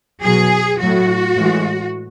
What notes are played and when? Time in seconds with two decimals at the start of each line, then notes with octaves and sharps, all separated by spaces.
0.22 B2 F#3 G#4
0.79 A2 F#3 F#4
1.36 A2 E3 G#3